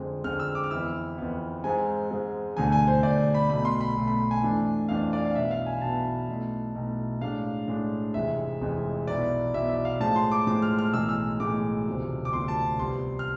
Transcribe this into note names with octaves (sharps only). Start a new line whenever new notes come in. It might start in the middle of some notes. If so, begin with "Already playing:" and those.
Already playing: F2 D3 G#3 C4
F2 D3 G#3 C4 F6
E6
D6
F6
F2 E3 B3 E4 E6
F2 E3 B3 E4
G#2 G#3 C4 G#5
G#2 G#3 C4
E1 D2 D3 A3 G#5
G#5
C5
E1 D2 D3 A3 D5
B5
B1 B2 A3 B5
C6
B5
B1 B2 A3
B5
G#5
F2 E3 A3 D4
F2 E3 A3 D4 F5
D5
F5
B1 B2 B3 E4 E5
F5
G#5
B1 B2 B3 E4 A5
B1 B2 A3 E4
B1 B2 A3 E4
A2 G#3 D4 F5
A2 G#3 D4
F1 F2 E3 G#3 E5
F1 F2 E3 G#3
B1 B2 B3 E4 D5
B1 B2 B3 E4 E5
E5
F5
A2 F3 G#3 A5
C6
D6
A2 F3 G#3 D6
F6
F6
B1 A2 E3 G#3 E6
E6
B1 A2 E3 G#3 D6
E1 D2 C3 F3
D6
E1 D2 C3 F3 C6
A5
C2 C3 F3 B3 C6
F6